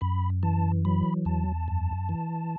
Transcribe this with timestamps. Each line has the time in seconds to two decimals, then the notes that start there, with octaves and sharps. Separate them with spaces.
0.01 F#2 B5
0.43 E3 A5
0.85 F#3 B5
1.25 E2 A5
1.68 F#2
2.09 E3